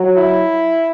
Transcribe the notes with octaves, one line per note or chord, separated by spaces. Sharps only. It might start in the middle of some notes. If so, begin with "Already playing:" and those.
Already playing: F#3
E4